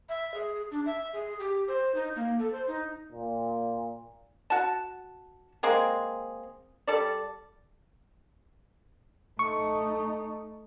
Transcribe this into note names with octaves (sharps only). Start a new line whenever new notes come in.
E5
G#4
D4
E5
G#4
G4
C5
D#4
A#3
A4
C5
D#4
A#2
F#4 A5
G#3 A#3 C4 G#4
G3 A4 D5
A3 D#4 C#6